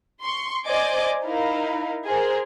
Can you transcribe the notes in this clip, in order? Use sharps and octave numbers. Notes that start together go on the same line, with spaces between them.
C6 C#6
C5 D5 D#5 G#5 D6
D#4 E4 A#4 F5
G#4 A#4 C5